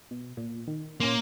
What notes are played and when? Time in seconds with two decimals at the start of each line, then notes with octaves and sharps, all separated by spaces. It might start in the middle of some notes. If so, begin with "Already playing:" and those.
0.11 B2
0.37 A#2
0.67 D#3
1.00 A#2 A#3 C#4 C6